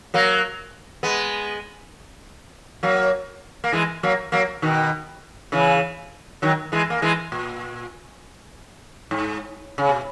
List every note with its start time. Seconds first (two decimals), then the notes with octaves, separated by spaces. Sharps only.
0.14 F#3 A#3
1.03 G#3 B3
2.83 F#3 A#3
3.64 A#3
3.72 E3 G#3
4.03 F#3 A#3
4.32 F#3 A#3
4.62 B2 D#3
5.52 C#3 E3
6.42 D#3 F#3
6.72 E3 G#3
6.90 A#3
7.02 E3 G#3
7.32 A#2
9.11 G#2
9.78 C#3
9.89 B2